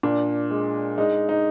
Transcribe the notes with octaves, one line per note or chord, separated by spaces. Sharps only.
A#2 D4
G#3
G#3 D#4
D#4